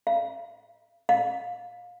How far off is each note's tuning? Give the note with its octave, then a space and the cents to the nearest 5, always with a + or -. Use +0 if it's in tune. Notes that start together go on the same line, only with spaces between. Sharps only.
F5 -35
F5 +30